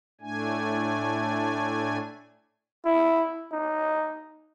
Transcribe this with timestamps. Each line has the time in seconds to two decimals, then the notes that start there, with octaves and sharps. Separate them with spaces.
0.21 A2 A3 D4 G#5
2.85 E4
3.52 D#4